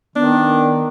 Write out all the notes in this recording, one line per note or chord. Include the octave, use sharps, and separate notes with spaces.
D#3 B3 D4